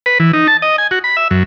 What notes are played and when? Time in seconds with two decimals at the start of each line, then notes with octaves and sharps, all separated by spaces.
0.06 B4
0.20 E3
0.33 D#4
0.47 A5
0.62 D#5
0.78 G#5
0.91 F#4
1.04 B5
1.17 E5
1.31 F#2